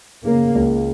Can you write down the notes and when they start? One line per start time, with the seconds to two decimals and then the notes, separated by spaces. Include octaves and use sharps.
0.25 C#3 A#3
0.55 C#2